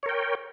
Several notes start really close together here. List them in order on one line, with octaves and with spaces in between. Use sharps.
C#5 A#4 G5